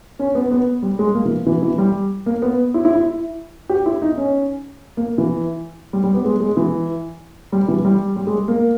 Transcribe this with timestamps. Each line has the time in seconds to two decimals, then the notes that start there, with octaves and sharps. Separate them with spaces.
0.19 C#4
0.35 B3
0.51 B3
0.83 G3
0.99 G#3
1.15 A#3
1.25 E3
1.46 E3
1.62 E3
1.78 G3
2.26 A#3
2.42 B3
2.74 E4
2.85 E4
2.95 E4
3.69 G4
3.86 E4
4.02 D#4
4.18 C#4
4.97 A#3
5.18 E3
5.93 G3
6.04 G3
6.14 B3
6.25 G#3
6.41 G#3
6.57 E3
7.52 G3
7.68 E3
7.85 G3
8.16 G3
8.27 G#3
8.48 A#3